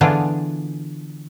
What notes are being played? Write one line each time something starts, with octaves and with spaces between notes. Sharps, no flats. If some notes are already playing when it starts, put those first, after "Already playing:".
D3 E3 B3 D4 F4 G#4